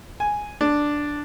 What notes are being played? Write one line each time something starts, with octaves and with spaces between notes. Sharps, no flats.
G#5
D4